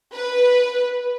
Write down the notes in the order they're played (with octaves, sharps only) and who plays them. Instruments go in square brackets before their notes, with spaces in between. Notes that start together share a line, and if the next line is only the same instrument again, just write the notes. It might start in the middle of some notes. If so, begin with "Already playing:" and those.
[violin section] B4